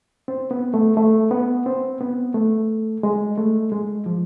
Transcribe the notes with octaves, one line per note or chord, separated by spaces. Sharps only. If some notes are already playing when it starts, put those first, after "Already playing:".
C4
B3
A3
A3
B3
C4
B3
A3
G#3
A3
G#3
F3